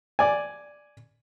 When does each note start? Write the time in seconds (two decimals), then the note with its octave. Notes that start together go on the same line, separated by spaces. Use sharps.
0.19 D5 G#5